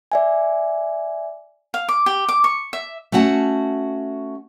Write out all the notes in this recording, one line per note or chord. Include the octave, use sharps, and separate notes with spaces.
D5 E5 G#5
F5
D6
G4
D6
C#6
E5
A3 C#4 F#4 F#5 A5